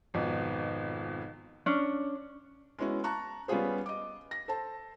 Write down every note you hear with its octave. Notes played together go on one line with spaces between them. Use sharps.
G#1 F2 B2
C#4 D4
G#3 B3 C#4 E4 F#4
A5 A#5 C#6 F#6
G3 B3 C#4 F4 G#4 C5
D#5 D6
A#6
A4 C5 A5